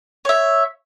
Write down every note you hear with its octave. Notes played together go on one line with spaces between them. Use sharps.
C#5 E5